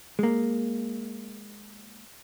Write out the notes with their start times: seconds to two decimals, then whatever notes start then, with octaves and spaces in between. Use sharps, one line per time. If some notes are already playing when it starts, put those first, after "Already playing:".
0.19 G#3 A#3